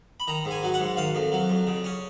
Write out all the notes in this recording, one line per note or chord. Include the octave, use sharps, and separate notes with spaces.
B5
D#3 A#5
G#2
G#5
F#3
F#5
G#2
D#3 F5
F2
F#3
F2
C#3
C#4